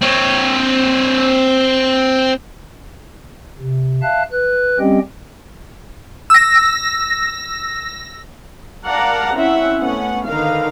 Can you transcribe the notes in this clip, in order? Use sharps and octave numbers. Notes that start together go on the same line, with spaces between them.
C4 C#5
C3
E5 F5 A5 F#6
B4 F#6
G3 C4 C#4 G4 D#5 G5
E6 A#6
A#4 D5 F5 F#5 A5 A#5
C4 C#4 E4 E5 F#5
A3 B3 C#4 F#5
D3 D#3 A#4 B4 F5